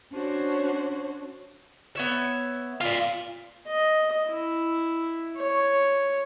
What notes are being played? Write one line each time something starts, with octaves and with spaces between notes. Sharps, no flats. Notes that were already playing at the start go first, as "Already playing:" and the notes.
C#4 D4 F#4 C5 C#5
B3 C#5 E5
F4 D5 F5
D#5
E4
C#5